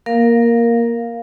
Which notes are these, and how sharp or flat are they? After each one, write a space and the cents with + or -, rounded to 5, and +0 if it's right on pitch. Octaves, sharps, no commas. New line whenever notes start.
A#3 +10 A#4 +0 F5 +0